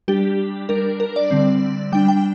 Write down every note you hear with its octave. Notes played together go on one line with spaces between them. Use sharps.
G3 D4 G4
G3 D4 A#4
A#4
D5
D3 G3 C4
G3 D4 G5
G5